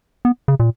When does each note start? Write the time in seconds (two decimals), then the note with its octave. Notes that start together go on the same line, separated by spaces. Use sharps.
0.25 B3
0.48 C#3
0.60 A#2